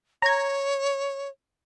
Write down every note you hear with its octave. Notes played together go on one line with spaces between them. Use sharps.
C#5 A#5 G#6